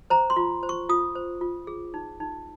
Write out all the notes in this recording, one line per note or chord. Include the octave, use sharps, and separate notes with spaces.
C5 A#5
C6
F4
C5
C#6
F4 D#6
C5
F4
G#4
D#4
D#4